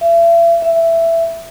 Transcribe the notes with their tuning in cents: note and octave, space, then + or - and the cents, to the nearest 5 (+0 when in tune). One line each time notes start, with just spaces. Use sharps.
E5 +40
E5 +10